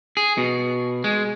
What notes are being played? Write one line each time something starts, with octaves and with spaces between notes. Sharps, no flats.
G#4
B2
G#3